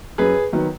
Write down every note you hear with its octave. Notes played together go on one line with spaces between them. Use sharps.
F#2 G#4 B4
D#3 F#3 B3